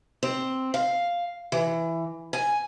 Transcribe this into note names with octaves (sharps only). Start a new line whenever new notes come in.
C4
F5
E3
G#5